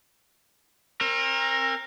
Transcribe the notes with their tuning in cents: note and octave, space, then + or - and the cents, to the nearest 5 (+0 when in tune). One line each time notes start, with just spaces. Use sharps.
C4 +40 A#4 +0